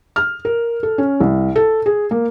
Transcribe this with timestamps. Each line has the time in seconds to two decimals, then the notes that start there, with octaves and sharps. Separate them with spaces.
0.16 F6
0.45 A#4
0.83 A4
0.98 C#4
1.20 C2
1.56 A4
1.86 G#4
2.11 A#3